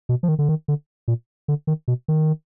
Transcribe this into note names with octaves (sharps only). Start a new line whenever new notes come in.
B2
F3
D#3
D3
D#3
D3
A#2
D3
D#3
B2
D#3